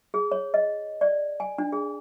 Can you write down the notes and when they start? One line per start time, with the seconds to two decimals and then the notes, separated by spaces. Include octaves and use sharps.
0.14 G#4
0.31 C#5
0.54 D#5
1.01 D5
1.40 G#5
1.58 D4
1.72 G#4